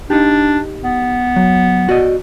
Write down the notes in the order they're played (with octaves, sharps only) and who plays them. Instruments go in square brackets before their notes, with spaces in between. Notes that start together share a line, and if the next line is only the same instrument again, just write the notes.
[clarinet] D4 [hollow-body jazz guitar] D#4 G4
[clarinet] B3
[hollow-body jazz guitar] F#3
F#4 D5 D#5